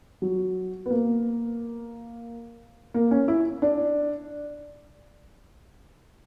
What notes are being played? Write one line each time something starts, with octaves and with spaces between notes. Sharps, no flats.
F#3
B3
A#3
A#3
C#4
E4
D4